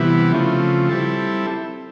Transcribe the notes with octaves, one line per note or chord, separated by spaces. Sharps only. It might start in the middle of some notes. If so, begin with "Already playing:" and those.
Already playing: C3 E3 G3 B3 E4
C#3 F3 A3 C4
G3 C4 E4 A4